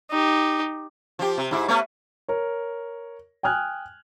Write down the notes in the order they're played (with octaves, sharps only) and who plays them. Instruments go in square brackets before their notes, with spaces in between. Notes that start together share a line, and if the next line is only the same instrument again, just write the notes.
[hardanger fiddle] D#4 G4
[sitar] F3 G4
C3
G#2 E4
A3 B3 C#5
[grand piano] A#4 C#5
G5 G#5 D#6 F6 F#6 G#6